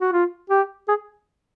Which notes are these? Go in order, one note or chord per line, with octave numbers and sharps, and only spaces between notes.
F#4
F4
G4
G#4